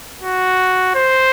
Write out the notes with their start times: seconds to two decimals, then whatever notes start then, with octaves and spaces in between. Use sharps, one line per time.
0.22 F#4
0.95 C5